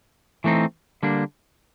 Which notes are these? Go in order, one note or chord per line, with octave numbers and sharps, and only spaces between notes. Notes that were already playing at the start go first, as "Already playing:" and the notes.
E3 A3 C4 D#4
D3 G3 A#3 D4